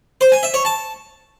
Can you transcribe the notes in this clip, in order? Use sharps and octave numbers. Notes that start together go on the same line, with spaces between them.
C5
G#5
E5
C#5
A5